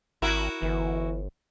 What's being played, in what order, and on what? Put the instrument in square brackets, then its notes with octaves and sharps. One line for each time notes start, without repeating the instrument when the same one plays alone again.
[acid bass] G#1 [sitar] E4 F#4 A#4
[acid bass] G1 [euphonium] E3